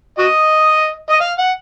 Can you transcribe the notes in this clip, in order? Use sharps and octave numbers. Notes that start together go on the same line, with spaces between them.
F#4 D#5
D#5
F5
F#5